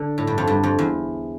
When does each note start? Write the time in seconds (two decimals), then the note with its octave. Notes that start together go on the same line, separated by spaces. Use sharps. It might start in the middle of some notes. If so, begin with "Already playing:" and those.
Already playing: D3
0.18 A2
0.27 G2
0.38 F2
0.47 G2
0.63 F2
0.79 E2